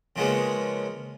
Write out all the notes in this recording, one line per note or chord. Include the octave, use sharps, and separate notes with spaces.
C#3 F3 G#3 A#3 B3 C#4